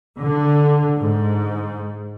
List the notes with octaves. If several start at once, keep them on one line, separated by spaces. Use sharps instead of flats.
D3
G#2